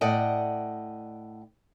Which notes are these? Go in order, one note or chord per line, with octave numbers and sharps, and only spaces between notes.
A2 D5 D#5 F#5 G5